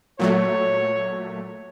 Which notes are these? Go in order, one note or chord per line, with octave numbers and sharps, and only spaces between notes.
A#2 F#3 A3 C#5